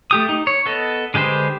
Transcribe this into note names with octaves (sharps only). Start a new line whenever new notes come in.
A3 G4 D#6
D#4
C#5
B3 A4 D#5
D3 G#3 G4 B4 C5